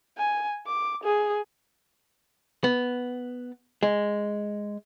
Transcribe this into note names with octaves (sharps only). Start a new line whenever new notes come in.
G#5
D6
G#4
B3
G#3